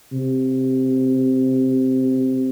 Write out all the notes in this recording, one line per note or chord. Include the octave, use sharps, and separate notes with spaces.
C3